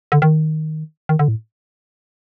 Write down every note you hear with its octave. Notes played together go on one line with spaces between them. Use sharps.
D3
D#3
D#3
D3
A2